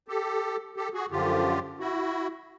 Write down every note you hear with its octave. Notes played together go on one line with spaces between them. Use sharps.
G4 A4
G4 A4
F#4 G#4
F#2 D3 F3 F4 G4
E4 F#4